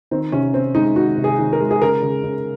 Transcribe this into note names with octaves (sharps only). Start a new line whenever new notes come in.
D#3 C4
C3 C#4
C3 C4
G#3 D#4
D#3 F#4
C3
G#4
D#3
A#4
G#3
G#4
C#3 A#4
C#3
C#3